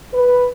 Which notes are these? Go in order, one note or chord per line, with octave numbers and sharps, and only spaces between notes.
B4